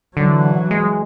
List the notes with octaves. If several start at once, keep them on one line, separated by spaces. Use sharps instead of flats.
D3 E3 F#3
G#3